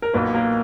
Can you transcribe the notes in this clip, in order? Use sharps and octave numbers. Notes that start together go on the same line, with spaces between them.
A#4
B1 A#2 B3 B4
A#3 A#4